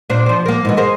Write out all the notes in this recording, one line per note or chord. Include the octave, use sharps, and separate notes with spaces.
A#2 D4 C5
F3 C5
A#3 A#4
G#2 B2 E3
G#3 A#4 C5